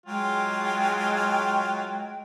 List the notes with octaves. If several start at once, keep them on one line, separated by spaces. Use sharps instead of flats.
F#3 G#3 F4 G5